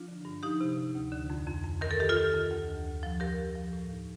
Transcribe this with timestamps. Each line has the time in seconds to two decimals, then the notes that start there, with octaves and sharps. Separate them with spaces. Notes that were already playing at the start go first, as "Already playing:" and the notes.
Already playing: F3 D4 F4
0.08 D3
0.25 G2
0.43 F3 D#4 G4
0.61 C3
0.77 C3
0.95 D2
1.12 D3
1.30 F2
1.47 F2
1.64 F2
1.81 D#3 A#4
1.91 A4
1.99 D#3 G4
2.09 F4 A4
2.16 D#3
2.33 F2
2.50 D2
2.68 D2
2.86 D2
3.03 F3
3.20 F3 G4 A#4
3.38 F3
3.55 F3
3.73 A2
3.90 D#2